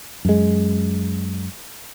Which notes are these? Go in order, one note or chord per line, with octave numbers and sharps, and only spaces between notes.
F#2 G#3